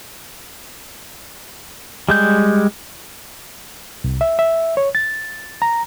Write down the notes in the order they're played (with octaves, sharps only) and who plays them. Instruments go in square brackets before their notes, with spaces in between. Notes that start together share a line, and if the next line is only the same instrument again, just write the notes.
[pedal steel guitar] G3 G#3 G6
[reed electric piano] C2
E5
E5
C#5
A6
A#5